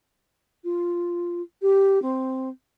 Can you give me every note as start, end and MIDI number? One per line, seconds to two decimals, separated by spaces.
0.64 1.41 65
1.62 2.01 67
2.02 2.49 60